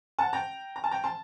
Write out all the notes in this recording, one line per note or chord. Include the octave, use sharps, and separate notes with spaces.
F#5 A5
G5 A#5
A#5
A5
G5 A#5
A5 C6